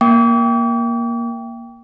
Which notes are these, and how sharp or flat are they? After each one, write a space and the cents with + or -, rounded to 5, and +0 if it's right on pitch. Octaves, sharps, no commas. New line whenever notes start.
A#3 +15 G5 +0 D6 -45